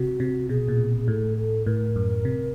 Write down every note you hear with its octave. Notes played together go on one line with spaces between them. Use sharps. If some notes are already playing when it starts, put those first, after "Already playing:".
Already playing: C3 F#4
C3
B2 G#4
A#2
A2 A4
A4
A2 A#4
F#2
C3